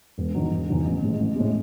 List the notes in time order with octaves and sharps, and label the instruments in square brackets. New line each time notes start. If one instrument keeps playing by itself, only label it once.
[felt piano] E1
E2 D#3 F#3
E1
E2 D#3 F#3
A1
A2 G#3
A1
A2 G#3